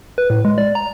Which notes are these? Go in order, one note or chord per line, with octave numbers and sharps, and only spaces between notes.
B4
A2
G#3
D5
A#5